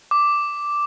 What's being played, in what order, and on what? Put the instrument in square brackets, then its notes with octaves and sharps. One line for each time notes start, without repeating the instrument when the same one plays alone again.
[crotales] D6